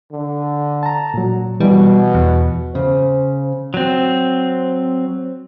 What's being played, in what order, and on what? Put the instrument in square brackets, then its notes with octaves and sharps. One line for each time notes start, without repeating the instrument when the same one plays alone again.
[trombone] D3
[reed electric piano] A5 A#5
A#2 F#3
[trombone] B2 [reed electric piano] E3 [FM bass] G3
[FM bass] E2
[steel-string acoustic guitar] C#3 [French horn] C5
[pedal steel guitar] F#3 C4